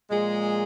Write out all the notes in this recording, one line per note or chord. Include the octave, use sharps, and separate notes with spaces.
A#2 F3 G#3